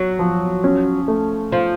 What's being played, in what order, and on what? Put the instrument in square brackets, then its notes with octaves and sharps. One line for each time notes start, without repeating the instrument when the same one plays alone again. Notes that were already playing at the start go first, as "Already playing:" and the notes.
Already playing: [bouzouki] F#3 [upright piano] F#4
[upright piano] F3
C#4
A3
[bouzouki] F3 [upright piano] F4